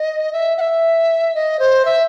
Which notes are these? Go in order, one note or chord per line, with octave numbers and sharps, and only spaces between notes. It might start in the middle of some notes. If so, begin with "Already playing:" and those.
Already playing: D#5
E5
F#5
E5
D#5
C5
E5